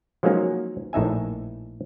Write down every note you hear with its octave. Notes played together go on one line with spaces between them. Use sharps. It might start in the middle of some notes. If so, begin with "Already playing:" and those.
F3 F#3 G#3 A#3 C#4 D#4
A#1 A2 D#4 E5 G#5